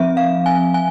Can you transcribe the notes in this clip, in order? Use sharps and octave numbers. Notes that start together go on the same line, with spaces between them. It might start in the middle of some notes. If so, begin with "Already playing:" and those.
Already playing: F3 C4 E5
F5
G#5
G#5